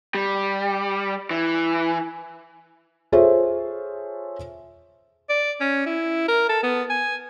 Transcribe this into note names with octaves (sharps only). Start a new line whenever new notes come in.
G3
E3
F4 G#4 A4 C5 C#5 E5
D5
C#4
E4
A#4
A4
B3
G#5